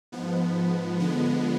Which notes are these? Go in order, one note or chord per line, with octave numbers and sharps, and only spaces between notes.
G#2 F3 B3
D3 F3 G#3 B3